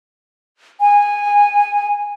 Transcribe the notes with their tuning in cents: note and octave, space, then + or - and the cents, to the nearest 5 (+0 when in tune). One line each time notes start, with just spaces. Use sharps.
G#5 -15